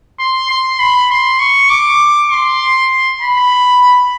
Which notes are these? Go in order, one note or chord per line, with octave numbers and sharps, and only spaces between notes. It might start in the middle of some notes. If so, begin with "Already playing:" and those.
C6
C6
B5
C6
C#6
D6
C6
B5